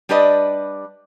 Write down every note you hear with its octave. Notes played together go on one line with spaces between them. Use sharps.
G3 D4 G4 B4 D5 D#5